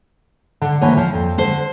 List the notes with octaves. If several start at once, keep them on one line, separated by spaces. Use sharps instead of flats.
D3
D2 D3 E3 A#3 C#5 G#5
F3
F2
D3 C5